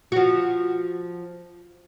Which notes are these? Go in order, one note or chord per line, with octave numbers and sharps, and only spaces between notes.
F3 F#4